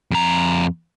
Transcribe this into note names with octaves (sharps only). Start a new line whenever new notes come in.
F2 A#5